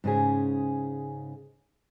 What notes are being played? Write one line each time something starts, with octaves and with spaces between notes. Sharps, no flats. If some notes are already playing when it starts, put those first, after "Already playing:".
G#2 C#3 C#4 G#4